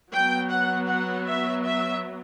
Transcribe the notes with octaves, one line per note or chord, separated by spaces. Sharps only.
F#3 B3 G5
F#5
F#5
E5
E5